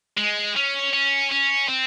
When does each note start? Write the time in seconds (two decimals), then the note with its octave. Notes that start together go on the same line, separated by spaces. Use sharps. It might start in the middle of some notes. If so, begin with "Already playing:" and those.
0.18 G#3
0.56 C#4
0.93 C#4
1.31 C#4
1.69 C4